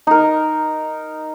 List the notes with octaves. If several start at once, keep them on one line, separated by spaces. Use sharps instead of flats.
D#4 A#4